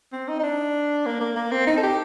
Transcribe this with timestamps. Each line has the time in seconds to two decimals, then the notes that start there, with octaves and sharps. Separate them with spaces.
0.13 C4
0.29 D#4
0.39 D#4
0.43 D4
1.06 A#3
1.21 A#3
1.36 A#3
1.51 C4
1.67 D#4
1.77 A4
1.83 G4